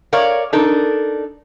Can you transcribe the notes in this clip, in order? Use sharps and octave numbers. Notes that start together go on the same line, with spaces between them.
A#4 C#5 D5 F5
D4 D#4 A4 A#4